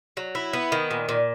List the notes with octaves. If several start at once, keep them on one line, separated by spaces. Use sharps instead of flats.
F#3
E4
B3
D#3
A#2
A#2